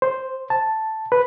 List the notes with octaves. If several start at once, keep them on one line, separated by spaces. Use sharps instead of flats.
C5
A5
B4